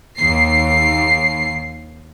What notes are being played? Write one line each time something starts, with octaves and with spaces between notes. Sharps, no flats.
D#2 C7